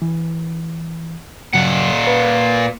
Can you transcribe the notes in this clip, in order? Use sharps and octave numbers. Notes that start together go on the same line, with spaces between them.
E3
G2 A#2 C#3 F#3 F#5
B4